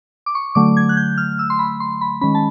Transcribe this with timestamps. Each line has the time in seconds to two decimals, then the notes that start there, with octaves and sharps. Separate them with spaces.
0.26 D6
0.35 C#6
0.55 D3 F#3 A3 D6
0.77 G#6
0.89 F#6
0.97 G6
1.18 F6
1.39 E6
1.50 C6
1.59 B5
1.80 C6
2.01 B5
2.21 D#3 G#3 C#4 B5
2.35 A5